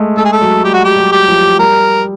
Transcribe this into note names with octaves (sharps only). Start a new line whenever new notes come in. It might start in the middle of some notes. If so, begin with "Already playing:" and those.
Already playing: G#3 A3
G#3 A4
G#4
A4
F#3
G3 G4
F#4
G4
F#3
G4
F3
G3 A#4